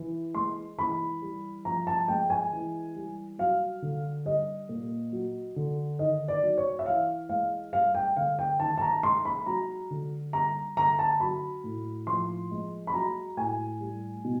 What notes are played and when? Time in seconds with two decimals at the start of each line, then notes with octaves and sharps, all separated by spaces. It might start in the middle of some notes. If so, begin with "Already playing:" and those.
Already playing: E3
0.35 G#3 C6
0.78 E3 B5
1.22 G3
1.65 F3 A#5
1.87 A5
2.08 G#3 G5
2.30 G#5
2.52 E3
2.96 G3
3.39 F#3 F5
3.82 D3
4.25 G3 D#5
4.69 A#2
5.12 F#3
5.56 D3
5.99 D#3 D#5
6.28 D5
6.43 F#3
6.58 C#5
6.79 E5
6.86 E3 F5
7.29 G#3 F5
7.73 G3 F5
7.95 G5
8.16 D3 F5
8.39 G5
8.60 D#3 A5
8.78 A5
8.81 A#5
9.03 G#3 C6
9.25 B5
9.46 F#3 A#5
9.91 D3
10.33 G3 A#5
10.77 D3 A#5
10.99 A5
11.20 F#3 B5
11.64 A2
12.07 F3 C6
12.51 G#3
12.87 B5
12.94 F#3 A#5
13.37 A2 G#5
13.81 G3
14.25 B2